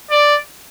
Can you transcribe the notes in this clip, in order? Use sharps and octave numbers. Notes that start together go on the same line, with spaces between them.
D5